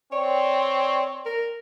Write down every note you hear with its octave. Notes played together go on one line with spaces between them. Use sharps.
C4 C#5 D5
A#4